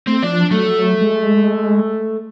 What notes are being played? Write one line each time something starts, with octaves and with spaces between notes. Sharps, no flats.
A3 C4
F3 D4 D5
F#3 A3
G#3